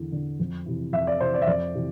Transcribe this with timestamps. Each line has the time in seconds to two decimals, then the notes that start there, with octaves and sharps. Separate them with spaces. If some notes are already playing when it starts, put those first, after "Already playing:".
Already playing: E2 D3
0.12 D3
0.39 F2
0.66 C3 E3
0.93 F2 E5
1.07 D5
1.20 C3 E3 C5
1.34 D5
1.42 E5
1.47 F2 D5
1.74 C3 E3